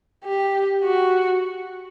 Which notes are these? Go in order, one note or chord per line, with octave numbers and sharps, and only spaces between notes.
G4
F#4